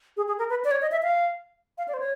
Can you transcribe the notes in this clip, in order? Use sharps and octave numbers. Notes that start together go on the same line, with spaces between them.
G#4
G#4
A#4
B4
D5
C#5
D#5
E5
F5
F5
D5
C5
C#5